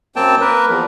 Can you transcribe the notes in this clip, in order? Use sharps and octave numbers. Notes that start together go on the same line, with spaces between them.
F#2 A#3 C4 G5 A5
A#3 A#4 B4
E2 F3